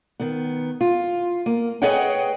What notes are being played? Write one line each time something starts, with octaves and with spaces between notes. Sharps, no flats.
D#3 B3
F4
A#3
G#4 B4 C#5 D#5 F#5 G5